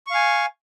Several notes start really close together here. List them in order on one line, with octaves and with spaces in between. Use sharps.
C#6 F5 G#5